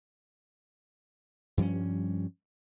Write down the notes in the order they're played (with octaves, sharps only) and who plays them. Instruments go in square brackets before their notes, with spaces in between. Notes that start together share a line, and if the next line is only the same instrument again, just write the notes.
[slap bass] G2 F3 G3 C#4